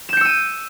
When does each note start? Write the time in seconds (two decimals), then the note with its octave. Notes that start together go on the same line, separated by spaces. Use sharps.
0.09 E7
0.13 G6
0.17 C#7
0.21 E6
0.25 D#7